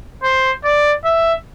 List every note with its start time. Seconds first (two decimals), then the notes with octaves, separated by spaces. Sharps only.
0.23 C5
0.64 D5
1.05 E5